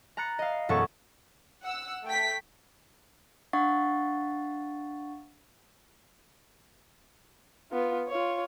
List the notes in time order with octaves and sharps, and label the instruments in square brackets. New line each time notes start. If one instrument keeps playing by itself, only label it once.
[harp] A#5 B5 F#6 A6 C#7
D#5 F5
E1 F#2 B3 A4 C#5 C#6
[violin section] F#5 E6
A3 G5 B6
[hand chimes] D4 F5 F#5 C#6 A6
[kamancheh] B3 F4
F4 C#5